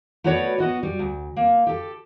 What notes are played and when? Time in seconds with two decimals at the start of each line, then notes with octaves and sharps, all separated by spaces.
0.24 A3 B3 F#4 B4 C#5 D5
0.58 B3 F#4 D#5
0.83 G3
0.99 D2
1.36 A#3
1.67 G4 A4